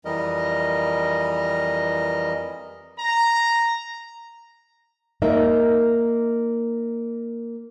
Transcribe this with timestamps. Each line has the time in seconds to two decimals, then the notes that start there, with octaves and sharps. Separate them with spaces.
0.05 F2 E3 G3 A#4 D#5
2.99 A#5
5.22 A#3 D#4 A#4 E5